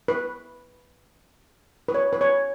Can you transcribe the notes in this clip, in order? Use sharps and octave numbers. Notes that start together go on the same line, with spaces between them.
B4
B4
C#5
B4
C#5